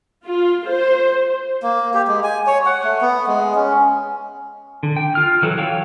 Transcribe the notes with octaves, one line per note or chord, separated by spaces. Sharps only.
F4
C5
A#3
G4
G#3
G#5
C#5
F#5
A3
B3
G#3
C#4
D3
G5
F4 F6
E3 F#3 A4
C#5 F5 G5